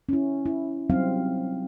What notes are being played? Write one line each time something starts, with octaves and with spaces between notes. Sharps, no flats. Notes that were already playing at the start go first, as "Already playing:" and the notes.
C#4 E4
E4
F#3 G3 C4 D#4 F5